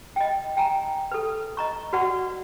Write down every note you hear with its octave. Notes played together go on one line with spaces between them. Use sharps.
D#5 G5
G5 G#5 A#5
A4 B4
D#5 A#5 C#6
F#4 B4 D5 F#5 C#6